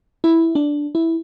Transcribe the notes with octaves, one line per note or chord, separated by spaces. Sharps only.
E4
D4
E4